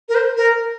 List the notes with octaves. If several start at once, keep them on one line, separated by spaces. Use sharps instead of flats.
A#4
C5
A#4